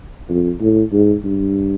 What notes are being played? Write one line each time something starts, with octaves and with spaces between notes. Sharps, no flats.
F2
A2
G#2
G2